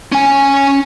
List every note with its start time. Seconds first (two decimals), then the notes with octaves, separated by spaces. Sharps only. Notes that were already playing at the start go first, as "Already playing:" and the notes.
0.12 C#4 G#5